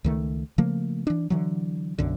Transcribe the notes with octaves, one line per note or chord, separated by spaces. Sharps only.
C#2 D#3 A3
C#3 F3 A3 A#3
E3 D4
D3 E3 F#3
B1 F#2 D3